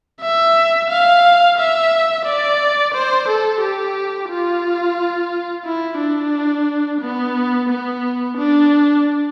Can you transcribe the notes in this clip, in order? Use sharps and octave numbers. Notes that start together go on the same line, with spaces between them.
E5
F5
E5
D5
C5
A4
G4
F4
E4
D4
B3
B3
D4